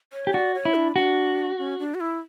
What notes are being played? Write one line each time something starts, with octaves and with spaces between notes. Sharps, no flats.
C#5
G4
F#4 D5
C#5
E4
D4
D4 F#4
C#4
D4
F#4
E4